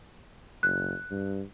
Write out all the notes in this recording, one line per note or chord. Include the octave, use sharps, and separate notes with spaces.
F#1 F#6
G2